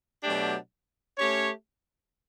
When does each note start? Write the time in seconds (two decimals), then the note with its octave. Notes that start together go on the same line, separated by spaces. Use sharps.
0.23 B2 F#3 A3 D4 G4
1.18 A3 C#4 G4 C#5